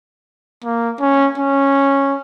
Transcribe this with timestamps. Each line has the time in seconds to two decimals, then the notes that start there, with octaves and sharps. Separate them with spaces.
0.64 A#3
1.01 C#4
1.38 C#4